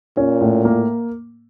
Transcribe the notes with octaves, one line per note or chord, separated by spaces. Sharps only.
A#2 C#4
A2
A#3